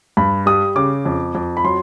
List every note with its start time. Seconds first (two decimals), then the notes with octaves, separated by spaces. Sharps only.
0.17 G2 B5
0.46 G3 D#6
0.75 C#3 D6
1.06 F2
1.35 F2
1.57 B5
1.64 F#3 C6